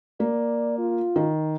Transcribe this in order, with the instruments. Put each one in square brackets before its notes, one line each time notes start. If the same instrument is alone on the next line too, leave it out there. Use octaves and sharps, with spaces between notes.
[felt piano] A#3 [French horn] D5
[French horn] F4
[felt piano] D#3